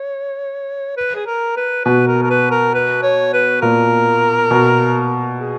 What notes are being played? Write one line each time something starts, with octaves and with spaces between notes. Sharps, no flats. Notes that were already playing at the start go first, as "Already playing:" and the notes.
Already playing: C#5
B4
G#4
A#4
B4
B2 B4
A#4
A#4
B4
A#4
B4
C#5
B4
A#2 A#4
B2
G#4